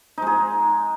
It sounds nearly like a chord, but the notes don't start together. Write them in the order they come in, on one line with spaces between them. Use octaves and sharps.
D#4 G#3 G#4